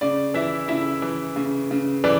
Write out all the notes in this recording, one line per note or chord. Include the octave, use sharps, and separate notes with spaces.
C#3 D5
E3 E4 E5
C#3 E4 E5
E3
C#3
C#3
E3 D5